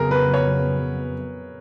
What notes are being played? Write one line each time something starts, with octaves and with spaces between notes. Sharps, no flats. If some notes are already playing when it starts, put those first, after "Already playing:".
Already playing: F2 C#3 F#3 B3 G#4 A#4
B4
C#5